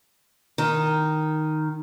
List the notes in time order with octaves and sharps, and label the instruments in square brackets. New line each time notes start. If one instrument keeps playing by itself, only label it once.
[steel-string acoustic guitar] D#3